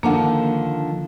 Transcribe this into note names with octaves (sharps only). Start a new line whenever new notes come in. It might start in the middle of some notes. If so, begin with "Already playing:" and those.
D3 D#3 F3 A#3 D4 F#5